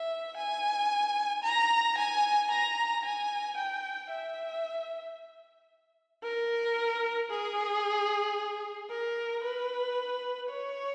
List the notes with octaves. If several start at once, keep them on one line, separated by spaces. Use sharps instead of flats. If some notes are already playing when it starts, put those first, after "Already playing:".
Already playing: E5
G#5
A#5
G#5
A#5
G#5
G5
E5
A#4
G#4
A#4
B4
C#5